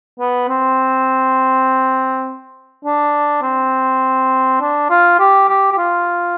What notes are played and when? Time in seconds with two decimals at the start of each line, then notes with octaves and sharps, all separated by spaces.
0.19 B3
0.48 C4
2.84 D4
3.42 C4
4.61 D4
4.90 F4
5.19 G4
5.49 G4
5.72 G4
5.78 F4